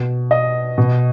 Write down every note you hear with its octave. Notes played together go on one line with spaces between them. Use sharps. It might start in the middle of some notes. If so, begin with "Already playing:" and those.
Already playing: B2
D#5
B2